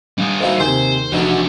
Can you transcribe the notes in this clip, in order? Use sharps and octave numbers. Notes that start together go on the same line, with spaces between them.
G2 G3 F4 D#6
G#3 A#3 D#4 E4 F#4 C5
D#2 C3 G#4 C5 G6
F1 B2 D3 E3 D4 F#4